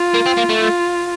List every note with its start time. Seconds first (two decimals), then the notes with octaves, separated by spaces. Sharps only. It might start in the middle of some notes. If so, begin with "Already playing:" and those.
Already playing: F4
0.14 A#3
0.26 C4
0.37 A#3
0.49 A3
0.61 F4